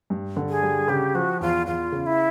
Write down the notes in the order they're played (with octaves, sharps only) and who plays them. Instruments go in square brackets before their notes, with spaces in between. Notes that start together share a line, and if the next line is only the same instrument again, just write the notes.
[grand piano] G2
D3
[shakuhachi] G#4
[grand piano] G3
[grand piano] C#3 [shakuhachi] G4
[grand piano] F3 [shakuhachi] F#4
[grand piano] E2 [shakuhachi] F4
[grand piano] E2 [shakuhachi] F4
[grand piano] C#3
[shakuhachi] E4